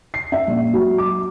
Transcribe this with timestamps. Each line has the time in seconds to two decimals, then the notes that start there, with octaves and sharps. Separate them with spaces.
0.14 C7
0.32 E5
0.47 A#1
0.74 F#3
0.98 D6